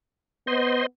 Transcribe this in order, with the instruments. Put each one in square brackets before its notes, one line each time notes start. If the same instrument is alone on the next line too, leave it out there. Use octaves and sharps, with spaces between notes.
[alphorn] B3 [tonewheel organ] C5 D#5 C6